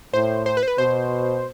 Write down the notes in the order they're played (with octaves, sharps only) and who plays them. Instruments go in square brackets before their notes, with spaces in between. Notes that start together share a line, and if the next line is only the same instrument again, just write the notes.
[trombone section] A2 [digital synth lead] C5
[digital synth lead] C5
B4
C5
B4
[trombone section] B2 [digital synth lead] C5